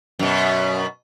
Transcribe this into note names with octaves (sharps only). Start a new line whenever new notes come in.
F#2 B2